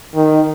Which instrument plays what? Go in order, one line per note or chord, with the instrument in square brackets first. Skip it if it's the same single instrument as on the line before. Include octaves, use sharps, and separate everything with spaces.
[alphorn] D#3